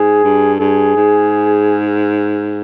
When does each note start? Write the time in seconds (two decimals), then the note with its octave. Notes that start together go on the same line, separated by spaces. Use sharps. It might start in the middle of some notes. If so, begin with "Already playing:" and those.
Already playing: G#2 G#4
0.24 G2
0.60 G2 G#4
0.96 G#2